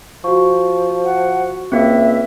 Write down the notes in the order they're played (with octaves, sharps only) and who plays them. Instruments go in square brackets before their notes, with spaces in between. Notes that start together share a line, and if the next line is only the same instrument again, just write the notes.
[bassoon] F3 [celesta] F#4 C#6
[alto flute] F#5
[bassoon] C#2 [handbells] A#3 C4 [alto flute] E5